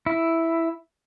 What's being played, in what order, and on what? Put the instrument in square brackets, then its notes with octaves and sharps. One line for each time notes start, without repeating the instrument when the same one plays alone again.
[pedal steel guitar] E4